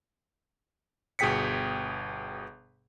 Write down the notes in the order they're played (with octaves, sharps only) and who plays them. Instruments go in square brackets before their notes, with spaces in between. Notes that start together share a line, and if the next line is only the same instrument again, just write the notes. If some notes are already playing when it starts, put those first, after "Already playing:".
[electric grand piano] G1 B2 G#4 G5 B6 C#7